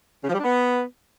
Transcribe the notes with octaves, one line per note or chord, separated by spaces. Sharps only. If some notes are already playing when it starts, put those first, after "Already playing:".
C#3
F3
G3
D4
B3